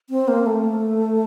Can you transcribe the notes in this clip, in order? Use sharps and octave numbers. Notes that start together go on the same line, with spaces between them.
C4
A#3
A3